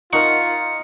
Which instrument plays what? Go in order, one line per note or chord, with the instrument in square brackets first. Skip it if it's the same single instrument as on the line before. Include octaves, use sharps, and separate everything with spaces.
[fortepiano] D#4 A#4 [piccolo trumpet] F4 [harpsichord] F#5 C#6